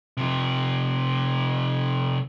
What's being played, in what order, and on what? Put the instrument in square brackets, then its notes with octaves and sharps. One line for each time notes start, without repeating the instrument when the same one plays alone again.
[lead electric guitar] C3 F3